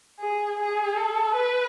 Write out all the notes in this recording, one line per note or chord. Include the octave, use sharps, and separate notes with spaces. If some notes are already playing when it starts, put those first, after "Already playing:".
G#4
G#4
A4
B4